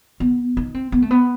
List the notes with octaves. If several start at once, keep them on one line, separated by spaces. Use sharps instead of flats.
B3
D#4
C4
B3
A3
B3